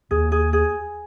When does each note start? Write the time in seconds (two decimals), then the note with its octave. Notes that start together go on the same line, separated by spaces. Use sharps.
0.11 D#2 G#4
0.32 G#4
0.53 G#4